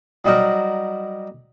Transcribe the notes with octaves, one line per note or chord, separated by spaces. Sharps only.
F#3 G3 D#4 F#4 A#4